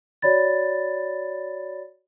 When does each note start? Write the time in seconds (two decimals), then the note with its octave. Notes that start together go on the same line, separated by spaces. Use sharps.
0.22 F#4 C#5 D5 B5 A6